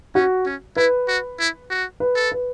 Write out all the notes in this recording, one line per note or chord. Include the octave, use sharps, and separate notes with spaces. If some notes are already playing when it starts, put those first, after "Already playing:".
C#4 F#4
C#4
E4 B4
F#4
E4
F#4
B4
A4
B4